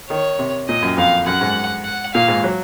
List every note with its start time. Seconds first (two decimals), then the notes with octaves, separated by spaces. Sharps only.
0.10 D#3 C#5
0.39 C3
0.68 A#2 D#5
0.82 F#2
0.97 F2 F5
1.26 F#2 F#5
1.41 G#2
1.85 F#5
2.14 A#2 F5
2.28 G#2
2.44 F#3